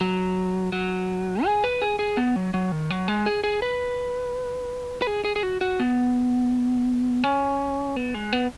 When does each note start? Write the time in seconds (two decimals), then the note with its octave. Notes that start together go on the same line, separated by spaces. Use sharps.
0.01 F#3
0.72 F#3
1.45 G#4
1.64 B4
1.82 G#4
1.99 G#4
2.17 B3
2.36 F#3
2.54 F#3
2.72 D#3
2.90 F#3
3.08 G#3
3.26 G#4
3.44 G#4
3.62 B4
5.02 B4
5.07 G#4
5.25 G#4
5.36 G#4
5.43 F#4
5.61 F#4
5.80 B3
7.24 C#4
7.96 B3
8.14 G#3
8.33 B3